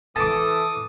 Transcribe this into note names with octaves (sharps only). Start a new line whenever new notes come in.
E3 A4 A5 D6 D#6